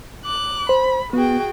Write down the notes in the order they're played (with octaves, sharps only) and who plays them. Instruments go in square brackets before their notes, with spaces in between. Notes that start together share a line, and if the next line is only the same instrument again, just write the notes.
[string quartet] D6 F#6
[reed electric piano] C5 [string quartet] B5
[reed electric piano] B3 [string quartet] F#4 G#4 G5